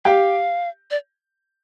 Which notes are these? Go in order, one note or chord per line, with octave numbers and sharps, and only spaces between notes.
G4 F5 G5
D5